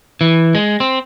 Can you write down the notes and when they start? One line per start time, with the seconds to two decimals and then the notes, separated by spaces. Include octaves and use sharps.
0.21 E3
0.55 G#3
0.80 C4